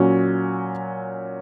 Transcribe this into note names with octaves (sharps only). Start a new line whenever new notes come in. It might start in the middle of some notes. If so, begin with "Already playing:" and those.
Already playing: A#2 F#3 C#4 F#4